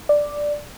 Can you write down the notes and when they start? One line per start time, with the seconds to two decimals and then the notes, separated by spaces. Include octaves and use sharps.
0.09 D5